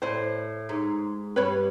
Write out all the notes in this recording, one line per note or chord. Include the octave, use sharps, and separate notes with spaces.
A2 C5 D5
G#2
G2 B4 C#5